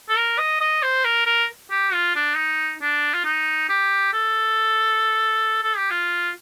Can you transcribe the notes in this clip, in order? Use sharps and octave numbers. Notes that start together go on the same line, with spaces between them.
A4
A#4
D#5
D#5
C5
A#4
A#4
G4
F4
D4
D#4
D4
F4
D#4
G4
A4
A4
G4
F4